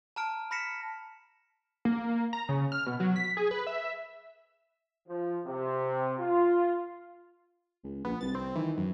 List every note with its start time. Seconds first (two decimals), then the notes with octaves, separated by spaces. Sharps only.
0.16 A5 A#5 F6 D7
0.51 B5 F6 A#6 B6 C#7 E7
1.85 A#3
2.33 A#5
2.49 C#3
2.72 F6
2.87 B2
3.00 F#3
3.16 B6
3.37 G#4
3.51 B4
3.67 E5
5.09 F3
5.46 C3
6.19 F4
7.84 C#2
8.05 A#1 B3
8.21 C2 A6
8.35 C4
8.55 D#3 E3
8.77 F#2